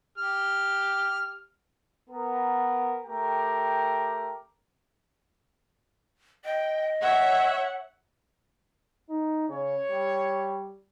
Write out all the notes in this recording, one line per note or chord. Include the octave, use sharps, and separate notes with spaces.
G4 F6
B3 A#4
A3 G4 A#4 G5
D#5 G5
C#5 E5 F#5
D#4
C#3 C#5
G3